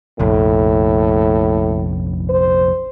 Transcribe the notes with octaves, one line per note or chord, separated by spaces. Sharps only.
F1 A#1 A2
C5